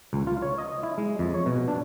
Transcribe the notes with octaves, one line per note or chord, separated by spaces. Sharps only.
C#2
F4
C#5
D#5
E4
G#3
F2
C#5
B2
D4